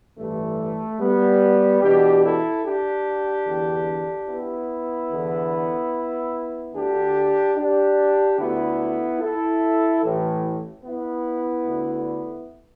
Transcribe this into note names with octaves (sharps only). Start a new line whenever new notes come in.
A1 G2 E3 A3
G3 B3
E2 B2 D4 G4
E4 A4
D4 G4
E2 D3
B3 E4
E2 D3
D2 D3 D4 G4
D4 G4
D2 D3 B3 E4
E4 A4
A1 A2 E3
B3 E4
D2 D3